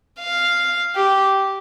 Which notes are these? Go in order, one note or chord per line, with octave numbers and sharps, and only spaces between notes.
F5
G4